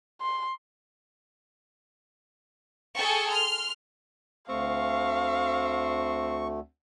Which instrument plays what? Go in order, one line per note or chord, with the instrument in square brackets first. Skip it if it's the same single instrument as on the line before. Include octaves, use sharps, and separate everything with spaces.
[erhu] C6
[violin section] G#4 A4 G5 A5 C#6
C6 F6
[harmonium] D2 A3 [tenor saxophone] C4 [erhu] F5 [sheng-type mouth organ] C#6